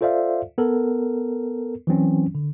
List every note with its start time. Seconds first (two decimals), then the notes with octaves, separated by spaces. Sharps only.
0.01 F4 A4 C5 D5 E5 F5
0.58 B3 A4 A#4
1.87 E3 F#3 C4 C#4
2.35 D3